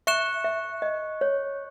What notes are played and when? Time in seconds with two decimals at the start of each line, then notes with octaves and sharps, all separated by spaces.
0.07 E5 C#6 F#6 C#7 E7
0.44 E5
0.82 D#5
1.21 C#5